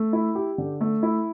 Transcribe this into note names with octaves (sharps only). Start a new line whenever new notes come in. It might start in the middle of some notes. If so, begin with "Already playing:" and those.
Already playing: A3
E4
G4
D3
A3
E4